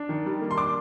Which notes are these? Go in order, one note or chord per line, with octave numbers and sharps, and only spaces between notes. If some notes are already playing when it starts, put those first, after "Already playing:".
Already playing: D4
D#3
G3
A#3
C6
D4 D6